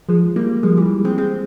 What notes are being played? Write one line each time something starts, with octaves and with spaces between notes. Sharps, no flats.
F3 G#3
G3 A#3
F3 G#3
E3 G3
G#3 C4
G#3 C4